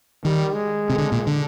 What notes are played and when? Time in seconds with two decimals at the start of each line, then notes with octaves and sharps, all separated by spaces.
0.25 D#3 G3
0.54 G#3
0.90 C3
0.98 D3
1.12 A#2
1.27 D3